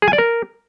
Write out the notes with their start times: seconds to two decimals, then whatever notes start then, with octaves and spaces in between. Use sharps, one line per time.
0.02 G#4
0.08 G#5
0.13 D5
0.18 A#4